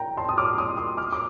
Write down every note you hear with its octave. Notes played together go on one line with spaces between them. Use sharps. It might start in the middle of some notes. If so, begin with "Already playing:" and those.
Already playing: G5 A#5
A5 C6
D#6
D6 F6
C6 D#6
C6 D#6
D6 F6
D6